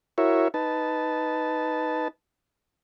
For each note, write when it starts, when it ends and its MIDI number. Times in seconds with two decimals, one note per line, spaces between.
0.18 0.48 64
0.18 0.48 66
0.18 0.48 70
0.18 0.48 73
0.18 0.48 76
0.54 2.08 63
0.54 2.08 71
0.54 2.08 81